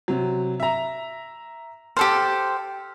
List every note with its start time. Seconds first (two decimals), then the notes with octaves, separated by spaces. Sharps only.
0.08 C3 F#3
0.60 E5 A#5
1.97 G4 A4 C5 F6